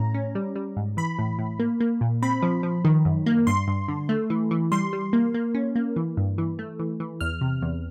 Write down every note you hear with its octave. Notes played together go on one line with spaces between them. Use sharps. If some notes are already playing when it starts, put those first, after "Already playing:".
Already playing: A2 C#4 A#5
C#4
G3
G3
G#2
E3 B5
A2
A2
A#3
A#3
A#2
C4 B5
F3
F3
D#3
F#2
A#3
G2 C6
G2
D3
A3
E3
E3
G3 C6
G3
A#3
A#3
C#4
A#3
E3
G2
E3
A3
E3
E3
E2 F6
C3
E2